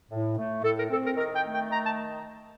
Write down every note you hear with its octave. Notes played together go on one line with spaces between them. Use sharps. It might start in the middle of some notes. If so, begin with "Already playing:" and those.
A2
A3
A2 A4
A#4
C4 A4
A#4
D#3 A#4
G5
A3
G5
D#3 A#5
A5